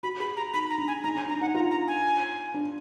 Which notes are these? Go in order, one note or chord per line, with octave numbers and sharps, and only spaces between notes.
F#4 B5
G#4 B5
A#5
D#4 B5
A#5
D4
G#5
D#4 A#5
D#4 G#5
D4 A#5
D#4 F#5
F4 A#5
A#5
G#5
D4